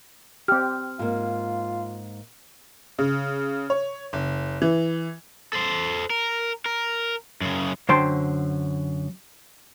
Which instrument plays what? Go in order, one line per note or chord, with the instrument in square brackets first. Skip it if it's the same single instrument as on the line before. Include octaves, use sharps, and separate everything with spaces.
[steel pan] C4 G4 [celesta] F6
[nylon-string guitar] G#2 A#3 [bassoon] F4
[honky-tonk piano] C#3
C#5
F#1
E3
[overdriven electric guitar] A4 C5
A#4
A#4
F#2 C#3
[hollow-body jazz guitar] F#2 D3 C5 G5 A5 C6